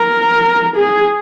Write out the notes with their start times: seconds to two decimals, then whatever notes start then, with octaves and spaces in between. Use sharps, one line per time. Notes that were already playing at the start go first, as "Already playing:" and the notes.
Already playing: A#4
0.76 G#4